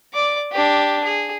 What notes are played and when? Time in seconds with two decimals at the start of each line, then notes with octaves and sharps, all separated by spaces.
0.13 D5 D6
0.51 D4 G4
1.04 G#4